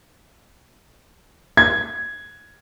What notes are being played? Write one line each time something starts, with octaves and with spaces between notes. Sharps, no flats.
G#6